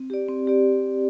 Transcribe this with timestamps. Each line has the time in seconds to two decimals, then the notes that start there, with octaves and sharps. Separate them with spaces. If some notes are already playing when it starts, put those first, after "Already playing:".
Already playing: C4
0.10 G4 D5
0.28 C4
0.47 G4 D5